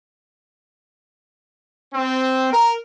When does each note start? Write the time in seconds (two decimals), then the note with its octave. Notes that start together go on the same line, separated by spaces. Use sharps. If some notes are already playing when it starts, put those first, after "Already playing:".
1.94 C4
2.53 A#4